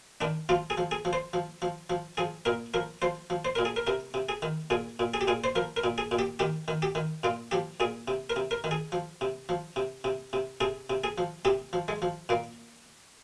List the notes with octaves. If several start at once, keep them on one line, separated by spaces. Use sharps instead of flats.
D#3 D4
F3 F4
G#4
F3
G#4
F3
C5
F3
F3
F3
F3 G#4
A#2 A#4
F3 A#4
F3 C5
F3
C5
A#2 A#4
G#4
A#4
C3 A#4
C3
G#4
D#3
A#2 G#4
A#2
G#4
G4
A#2 G#4
C5
F3 A#4
A#4
A#2
G#4
A#2
G4
D#3 G4
D#3
G4
D#3
A#2 F4
F3 G4
A#2 G#4
C3
A#4
C3
A#4
D#3
G#4
F3
C3
F3
C3
C3
C3
C3 G#4
C3
G#4
F3
C3 G4
F3
G#3
F3
A#2 A#3